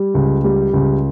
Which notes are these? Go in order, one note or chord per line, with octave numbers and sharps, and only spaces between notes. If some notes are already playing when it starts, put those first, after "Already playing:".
Already playing: G3
C#2
G3
C#2